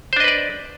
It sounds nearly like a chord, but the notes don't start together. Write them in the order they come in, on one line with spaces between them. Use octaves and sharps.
C5 D4 D#5 B4 D5